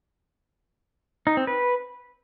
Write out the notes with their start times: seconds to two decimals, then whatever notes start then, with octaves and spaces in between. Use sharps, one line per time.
1.27 D#4
1.37 C4
1.47 B4